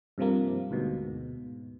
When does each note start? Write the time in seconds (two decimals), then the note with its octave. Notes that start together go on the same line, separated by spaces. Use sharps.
0.18 G2 C3 F3 A#3
0.71 D2 G#2 B2